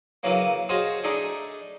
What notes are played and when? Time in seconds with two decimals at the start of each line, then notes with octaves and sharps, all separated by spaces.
0.23 C#3 E3 F#3 A#3
0.69 F#4 G#4 C5 C#5 D#5 F5
1.04 A3 D4 D#4 G#4 E5